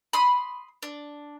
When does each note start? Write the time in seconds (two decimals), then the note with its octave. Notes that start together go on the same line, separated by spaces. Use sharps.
0.13 B5 C6 D#6
0.82 D4